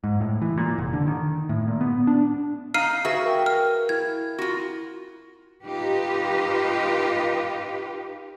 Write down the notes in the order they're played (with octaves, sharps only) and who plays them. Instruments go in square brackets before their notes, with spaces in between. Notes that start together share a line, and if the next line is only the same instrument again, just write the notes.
[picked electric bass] G#2
A2
E3
A#2
F1
D3
D#3
A2
A#2
B3
D4
[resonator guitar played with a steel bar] D#4 [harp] F5 [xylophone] F6 C7 D#7
[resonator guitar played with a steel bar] F#4 G#4 E5 [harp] B4
[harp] A#4 G5
[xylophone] F6
[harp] E4 [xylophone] G#6
[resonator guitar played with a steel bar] F4 F#4
[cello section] D#4 F4 G4 B4